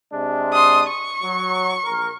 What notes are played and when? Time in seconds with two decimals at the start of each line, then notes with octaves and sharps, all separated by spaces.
0.13 C3 G#3 D4
0.53 C6 D#6
0.87 C#6
1.23 F#3
1.84 A#1 A#4